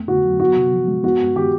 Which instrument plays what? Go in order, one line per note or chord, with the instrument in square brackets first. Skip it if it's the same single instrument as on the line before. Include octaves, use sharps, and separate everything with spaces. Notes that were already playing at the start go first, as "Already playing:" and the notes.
Already playing: [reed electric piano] F2 A3 B3
[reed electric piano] D3 [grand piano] F#4
[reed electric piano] F#3
[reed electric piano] B3 [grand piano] F#4
[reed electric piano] C3
F3
G#3
[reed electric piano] B3 [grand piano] F#4
[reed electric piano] G2
[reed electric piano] D#3 [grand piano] G4